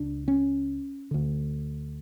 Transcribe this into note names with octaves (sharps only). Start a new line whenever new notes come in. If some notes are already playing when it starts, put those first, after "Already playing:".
Already playing: C#2 C#3 D4
C#4
D2 D3